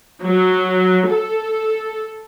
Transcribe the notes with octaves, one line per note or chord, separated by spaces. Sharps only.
F#3
A4